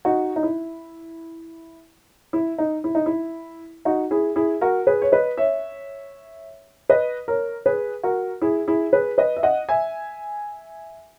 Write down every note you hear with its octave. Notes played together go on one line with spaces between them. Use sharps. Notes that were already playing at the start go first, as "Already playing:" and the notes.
D#4 F#4
D#4
E4
E4
D#4
E4
D#4
E4
D#4 F#4
E4 G#4
E4 G#4
F#4 A#4
G#4 B4
C#5
B4 D#5
C#5 E5
B4 D#5
A#4 C#5
G#4 B4
F#4 A#4
E4 G#4
E4 G#4
G#4 B4
B4 D#5
E5
D#5 F#5
E5 G#5